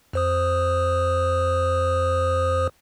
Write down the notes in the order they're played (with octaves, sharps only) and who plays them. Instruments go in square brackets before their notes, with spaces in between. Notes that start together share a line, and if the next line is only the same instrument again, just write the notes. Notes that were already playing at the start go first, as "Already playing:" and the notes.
[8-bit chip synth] F2 C5 D#6